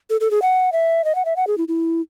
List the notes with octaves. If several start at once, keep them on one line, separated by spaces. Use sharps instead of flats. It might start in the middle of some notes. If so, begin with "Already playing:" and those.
A4
A4
G#4
F#5
E5
D#5
F#5
E5
F#5
G#4
E4
E4